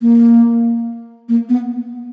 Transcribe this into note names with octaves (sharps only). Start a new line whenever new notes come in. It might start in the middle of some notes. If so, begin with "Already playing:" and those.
A#3
A#3
B3